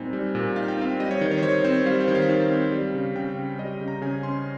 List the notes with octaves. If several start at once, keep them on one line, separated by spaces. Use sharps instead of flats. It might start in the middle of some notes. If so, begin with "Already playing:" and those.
Already playing: A#2 G3 C4 D#4 G#5
G3
A#2
D#4 F5
G5
C4 F5
G3 D#5
C#5
D#3 C#5
C#5
C5
D#3 C#5
C4 C5
G3 F5
C5
D#3
F5
D#3
C4
G3
C#3
C#3 G5
C#4
G3 D#5
C#3
A#5
C#3 G#5
C#4 C6